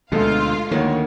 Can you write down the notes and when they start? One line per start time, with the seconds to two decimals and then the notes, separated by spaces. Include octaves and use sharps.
0.12 D2 B2 G#3 A3 F4 A4 F5
0.71 D2 D#3 A#3 C#5